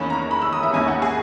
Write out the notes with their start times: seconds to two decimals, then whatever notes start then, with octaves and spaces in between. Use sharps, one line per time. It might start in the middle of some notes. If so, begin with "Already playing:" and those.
Already playing: E2 D#3 A#3 C#4 B5
0.10 A#5
0.31 B5
0.42 E6
0.53 D#6
0.63 E5
0.73 D#2 D#3 A#3 C#4 G#5
0.88 F#5
1.02 G#4